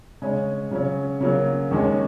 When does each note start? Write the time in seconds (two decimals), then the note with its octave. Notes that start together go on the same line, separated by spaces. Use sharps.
0.22 C#3 G#3 C#4
0.71 C#3 F#3 C#4
1.21 C#3 F#3 A#3
1.71 D#2 D#3 G#3 C#4